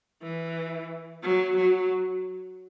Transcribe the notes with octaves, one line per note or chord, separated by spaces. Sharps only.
E3
F#3
F#3